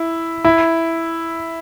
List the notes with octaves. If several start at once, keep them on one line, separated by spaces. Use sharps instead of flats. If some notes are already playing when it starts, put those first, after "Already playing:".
Already playing: E4
E4